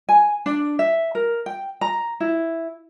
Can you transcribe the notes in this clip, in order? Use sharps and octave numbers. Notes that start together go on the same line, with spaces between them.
G#5
D4
E5
A#4
G5
A#5
E4